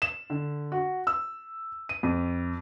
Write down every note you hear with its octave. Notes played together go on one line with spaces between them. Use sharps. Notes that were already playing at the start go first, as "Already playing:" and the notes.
E7
D3
F#4
E6
D#7
F2